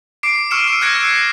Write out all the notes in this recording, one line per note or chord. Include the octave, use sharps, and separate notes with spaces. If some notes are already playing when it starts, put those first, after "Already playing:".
D6 C7 D7
C#6 E6 F6 C#7 E7
D7
E6 F#6 G#6 A#6 C#7
C7